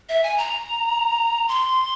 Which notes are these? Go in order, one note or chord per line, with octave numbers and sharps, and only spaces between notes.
E5
G#5
A#5
C6